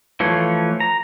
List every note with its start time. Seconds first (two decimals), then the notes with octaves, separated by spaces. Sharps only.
0.20 E3 F3 A3 C#5
0.80 A#5